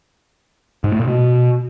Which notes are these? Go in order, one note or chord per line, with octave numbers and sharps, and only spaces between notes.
G#2
A3
A#2
B2